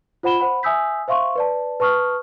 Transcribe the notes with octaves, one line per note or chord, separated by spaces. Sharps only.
F4 C5 F#5 B5 E7 G7
C5 F#5 B5
E5 G#5 D#6 E6 G6 B6
C5 E5 F5 C6 C#6
B4 D5 A5
B4 A5 C#6 D#6 F6